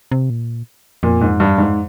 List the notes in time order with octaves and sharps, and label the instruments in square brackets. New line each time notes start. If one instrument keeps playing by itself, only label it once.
[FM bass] C3
A#2
[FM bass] F2 [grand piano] A#2
[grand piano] G#2
G2
G#2